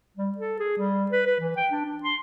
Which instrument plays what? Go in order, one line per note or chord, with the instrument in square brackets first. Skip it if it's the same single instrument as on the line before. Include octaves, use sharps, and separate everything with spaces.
[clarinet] G3
A4
G#4
G3
B4
B4
E3
G5
D4
D4
C6